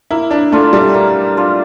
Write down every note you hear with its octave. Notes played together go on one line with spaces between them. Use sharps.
A#3 E4
D4
A3 D4 F4
G3
A#3
D4 F4